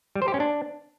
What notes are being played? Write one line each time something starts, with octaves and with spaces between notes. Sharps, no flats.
G3
C5
G4
C#4
D4